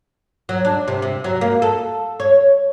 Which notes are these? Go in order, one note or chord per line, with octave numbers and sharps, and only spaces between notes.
F#3
D4
C3
C3
F#3
A#3
A4
C#5